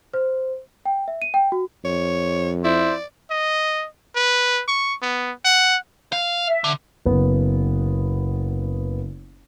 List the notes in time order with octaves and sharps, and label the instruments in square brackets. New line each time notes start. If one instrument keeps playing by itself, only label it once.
[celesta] C5
G5
E5
D#7
G5
F#4
[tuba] F2 [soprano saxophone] C#5
[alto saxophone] E4 [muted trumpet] C5 [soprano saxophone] D5
[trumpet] D#5
B4
C#6
B3
F#5
[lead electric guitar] F5
[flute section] E5
[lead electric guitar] D3
[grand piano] F#1 B3